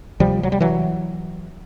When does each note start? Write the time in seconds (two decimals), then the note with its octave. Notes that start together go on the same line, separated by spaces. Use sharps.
0.20 D2 C3 F3 G3
0.43 F#3
0.52 G3
0.61 E3 F#3